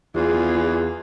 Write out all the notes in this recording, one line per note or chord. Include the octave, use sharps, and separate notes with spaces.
E2 F4 G#4